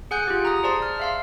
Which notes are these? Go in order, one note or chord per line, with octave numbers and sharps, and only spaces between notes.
G#4 F#5 G#5 F#6 G6
F4 G4
A#5 D#6
G#4 C5 D5 A5 C6
F6
E5 F5 C6